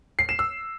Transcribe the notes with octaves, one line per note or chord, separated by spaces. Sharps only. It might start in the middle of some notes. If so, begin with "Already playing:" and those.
C7
E7
E6